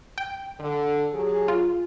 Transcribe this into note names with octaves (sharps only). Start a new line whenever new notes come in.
G5
D3
F#3 G4 G#4
F4